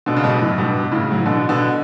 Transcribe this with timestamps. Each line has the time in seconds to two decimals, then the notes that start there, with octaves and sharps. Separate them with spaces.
0.06 B2 D3
0.16 C#3
0.24 G2 B2
0.41 F#2 A2
0.58 G2 B2
0.92 A2 C#3
1.11 F#3
1.19 E3
1.26 B2 D3
1.49 B2 D3